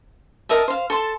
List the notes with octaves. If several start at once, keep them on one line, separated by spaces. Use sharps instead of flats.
A#4 D#5 E5 A5
C5 F5
A4 A5 C6